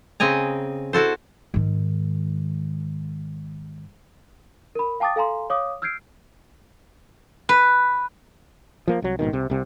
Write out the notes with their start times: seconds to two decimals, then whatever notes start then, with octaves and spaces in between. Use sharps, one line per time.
0.20 C#3 C4 D#5 G#5 A#5
0.93 E4 F#4 A4 C5
1.54 G#2 D#3
4.75 A#4 B5
5.00 F5 G5 A5 D6 D#6 A6
5.16 A4 F5 G#5 A#5 C6
5.50 C#5 F5 D6 D#6
5.82 E6 F6 G6 G#6 C7 D7
7.49 B4
8.88 F3 A#3
9.02 C2 F#3
9.19 A#1 G#2 B2 D#3
9.33 C2 C3
9.50 C2 C3